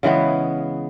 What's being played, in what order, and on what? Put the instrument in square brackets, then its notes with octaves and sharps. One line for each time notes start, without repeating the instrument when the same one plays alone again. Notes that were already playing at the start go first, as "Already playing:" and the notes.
[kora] C#3 E3 G#3 B3